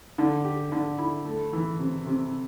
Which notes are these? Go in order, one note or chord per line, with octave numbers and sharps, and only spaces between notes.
D3
G4
D3
E4
A3
E3
C3
C3